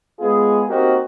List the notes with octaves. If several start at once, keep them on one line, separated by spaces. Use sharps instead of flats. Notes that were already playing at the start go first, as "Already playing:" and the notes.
G#3 B3 F4 G#4
A#3 C4 D#4 F#4 G4 A#4